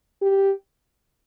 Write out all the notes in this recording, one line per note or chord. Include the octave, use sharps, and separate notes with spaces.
G4